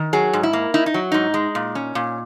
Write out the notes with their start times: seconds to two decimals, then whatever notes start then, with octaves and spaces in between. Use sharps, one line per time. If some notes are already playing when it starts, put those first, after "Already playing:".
Already playing: D#3
0.13 F#3 G#4
0.33 G#2
0.43 E4
0.53 A#3
0.74 D#4 E4
0.86 D#4
0.94 F#3
1.12 G#2 D#4
1.34 G#3
1.55 A#2
1.75 C#4
1.95 A#2